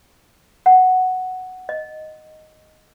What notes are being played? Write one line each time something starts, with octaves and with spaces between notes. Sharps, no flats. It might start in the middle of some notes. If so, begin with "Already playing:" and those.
F#5
D#5